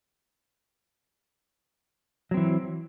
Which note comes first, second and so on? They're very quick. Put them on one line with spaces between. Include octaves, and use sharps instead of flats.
F#3 C4 E3